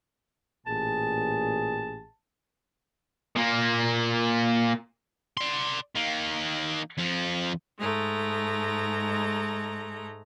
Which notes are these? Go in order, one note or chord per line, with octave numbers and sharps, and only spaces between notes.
A1 A#2 G#4 A5
A#2 A#3
D5 C6
D#3 A#3
F2 F3
G#2 G#3 A3 A#5